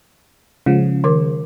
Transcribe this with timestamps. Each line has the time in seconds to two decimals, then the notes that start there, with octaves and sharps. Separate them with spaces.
0.66 C#3 F3 G#3
1.04 D#3 A#4 D6